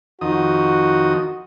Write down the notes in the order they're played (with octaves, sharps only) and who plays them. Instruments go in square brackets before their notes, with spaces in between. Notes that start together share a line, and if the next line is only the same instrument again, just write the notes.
[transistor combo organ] F2 D#3 D#6 [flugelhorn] F#4